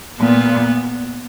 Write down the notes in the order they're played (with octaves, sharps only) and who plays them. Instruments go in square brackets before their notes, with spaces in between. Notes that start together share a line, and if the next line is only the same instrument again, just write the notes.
[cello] A#2 [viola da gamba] B3